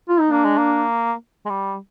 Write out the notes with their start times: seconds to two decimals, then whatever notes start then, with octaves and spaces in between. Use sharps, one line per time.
0.09 F4
0.20 D#4
0.30 A#3 D4
0.45 G#3
0.58 A#3
1.45 G#3
1.50 G3